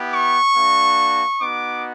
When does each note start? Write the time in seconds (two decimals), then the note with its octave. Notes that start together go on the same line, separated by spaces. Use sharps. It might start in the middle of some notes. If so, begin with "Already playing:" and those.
Already playing: B3 E4 G4
0.12 C#6
0.54 A#3 D4 F#4
1.40 B3 D#4 F#4 D6